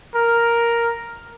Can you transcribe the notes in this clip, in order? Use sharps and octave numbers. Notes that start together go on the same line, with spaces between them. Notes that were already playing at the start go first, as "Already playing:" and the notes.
A#4